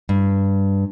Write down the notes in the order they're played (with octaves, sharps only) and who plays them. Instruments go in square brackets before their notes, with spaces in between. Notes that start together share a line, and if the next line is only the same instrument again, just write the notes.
[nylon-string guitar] G2